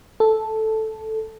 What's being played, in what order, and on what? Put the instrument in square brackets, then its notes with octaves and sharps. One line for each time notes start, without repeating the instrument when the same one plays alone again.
[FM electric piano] A4